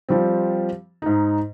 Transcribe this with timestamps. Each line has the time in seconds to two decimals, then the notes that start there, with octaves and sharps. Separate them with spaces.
0.09 F3 G3 C4
1.02 G#2 D#4